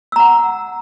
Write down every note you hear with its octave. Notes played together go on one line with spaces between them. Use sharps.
F#5 A#5 E6